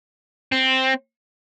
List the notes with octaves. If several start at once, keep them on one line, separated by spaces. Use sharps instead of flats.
C4